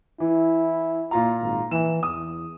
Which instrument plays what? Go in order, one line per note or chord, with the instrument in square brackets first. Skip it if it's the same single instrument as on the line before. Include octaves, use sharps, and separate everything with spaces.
[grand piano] E3 [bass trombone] E4
[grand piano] A#2 F4 A#5
[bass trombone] G#1
[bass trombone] E3 [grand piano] E7
[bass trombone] E2 [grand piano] D#6